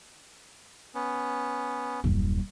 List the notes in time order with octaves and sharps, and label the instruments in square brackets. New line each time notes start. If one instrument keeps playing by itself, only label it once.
[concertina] B3 C#4
[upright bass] D#1 F#2